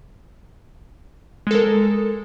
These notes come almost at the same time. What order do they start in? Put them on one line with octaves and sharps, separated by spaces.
G#3 A4 A#4